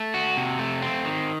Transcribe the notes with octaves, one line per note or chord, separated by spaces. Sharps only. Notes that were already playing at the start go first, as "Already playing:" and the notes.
Already playing: A3
F#4
C3
A3
C4
D#3